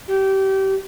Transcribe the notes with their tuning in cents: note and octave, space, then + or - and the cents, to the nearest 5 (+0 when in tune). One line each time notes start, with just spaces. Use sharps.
G4 -25